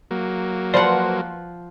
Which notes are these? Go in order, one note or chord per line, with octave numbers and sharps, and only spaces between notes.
F#3 A#3
F3 B4 C5 D5 F#5 C6